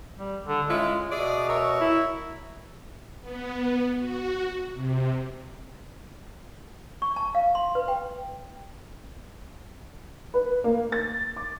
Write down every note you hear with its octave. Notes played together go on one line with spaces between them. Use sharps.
G3
D3
G#3 C#4 E4 F4
B2 G#4 D5 E5
A#4 C#5 E5
E4
B3
F#4
C3
C#6
A5
F5
C6
B4
G5
B4
A#3
A6
D6